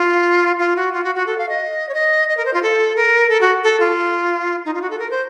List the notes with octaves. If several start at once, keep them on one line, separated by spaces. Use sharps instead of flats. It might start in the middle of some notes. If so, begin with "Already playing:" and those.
Already playing: F4
F4
F#4
F4
F#4
F#4
A4
F5
D#5
C#5
D#5
D#5
A#4
C5
F4
A4
A#4
A4
F#4
A4
F4
D#4
F4
F#4
A4
A#4
C5